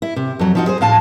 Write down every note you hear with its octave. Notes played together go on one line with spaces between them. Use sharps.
E4
C3
F2 F#3
F3 D#4 F#4
G#4 C5
A2 F5 A5